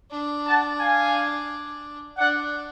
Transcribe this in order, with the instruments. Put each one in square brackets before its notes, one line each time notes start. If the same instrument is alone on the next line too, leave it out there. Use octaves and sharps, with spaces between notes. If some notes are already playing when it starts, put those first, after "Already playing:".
[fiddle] D4
[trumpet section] F#5 A5
F5 G#5
[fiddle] D4 [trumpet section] D5 F#5